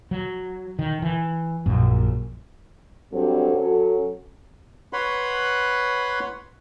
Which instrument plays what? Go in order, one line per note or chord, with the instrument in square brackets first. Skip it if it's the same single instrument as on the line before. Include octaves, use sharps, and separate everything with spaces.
[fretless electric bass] F#3
D#3
E3
A#1 F#2
[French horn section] G2 F#3 G3 C4 A4
F#3 C#4 F#4 A4
[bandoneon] B4 C#5 F#5 B5 C6